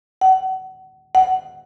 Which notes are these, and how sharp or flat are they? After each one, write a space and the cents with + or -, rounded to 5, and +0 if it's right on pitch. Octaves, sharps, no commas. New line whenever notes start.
F#5 +30
F#5 +15